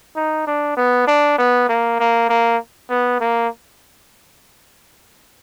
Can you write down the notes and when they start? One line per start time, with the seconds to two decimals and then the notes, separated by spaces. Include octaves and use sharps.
0.16 D#4
0.47 D4
0.77 B3
1.07 D4
1.38 B3
1.69 A#3
1.99 A#3
2.29 A#3
2.90 B3
3.20 A#3